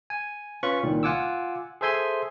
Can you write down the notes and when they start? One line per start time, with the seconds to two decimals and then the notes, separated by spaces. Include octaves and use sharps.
0.10 G#5
0.63 C#4 F4 B4 B5 C#6
0.83 C2 A#2 D#3
1.03 F4 F#5 G#5 D6 E6
1.81 G#4 A4 C5 E5 G#5 C6